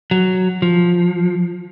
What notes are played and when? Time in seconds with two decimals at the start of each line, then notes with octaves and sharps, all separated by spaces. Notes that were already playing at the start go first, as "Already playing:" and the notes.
0.11 F#3
0.62 F3